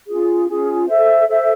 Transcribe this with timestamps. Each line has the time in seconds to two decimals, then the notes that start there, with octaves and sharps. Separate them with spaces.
0.07 C#4 F4 G#4
0.48 C#4 F4 G#4
0.87 A4 C5 E5
1.27 A4 C5 E5